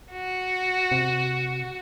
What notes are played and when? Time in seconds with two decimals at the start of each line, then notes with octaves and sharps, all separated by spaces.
0.12 F#4
0.91 C3